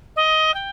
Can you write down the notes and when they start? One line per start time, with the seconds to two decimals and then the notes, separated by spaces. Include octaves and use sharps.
0.16 D#5
0.54 G5